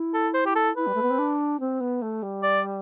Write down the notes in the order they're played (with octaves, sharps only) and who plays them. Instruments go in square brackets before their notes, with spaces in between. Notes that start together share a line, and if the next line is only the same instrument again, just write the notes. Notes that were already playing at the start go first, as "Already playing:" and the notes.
Already playing: [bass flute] E4
[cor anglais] A4
C5
G4
A4
[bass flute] E4 [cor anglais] B4
[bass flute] G3
A3
B3
C4
D4
C4
B3
A3
G3
[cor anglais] D5